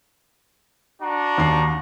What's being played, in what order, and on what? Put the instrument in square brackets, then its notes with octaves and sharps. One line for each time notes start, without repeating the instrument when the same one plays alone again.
[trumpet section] D4 F#4 A#5
[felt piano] D#2 C7